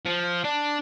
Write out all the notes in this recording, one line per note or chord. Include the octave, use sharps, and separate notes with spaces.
F3
D4